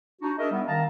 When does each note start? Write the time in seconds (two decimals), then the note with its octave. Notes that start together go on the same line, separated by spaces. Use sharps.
0.21 D4 D#4 F#4
0.37 D4 D#4 G#4 A#4 D#5 E5
0.51 G3 B3
0.66 D#3 F5 A5 A#5